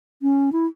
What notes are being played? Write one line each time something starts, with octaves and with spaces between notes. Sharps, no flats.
C#4
E4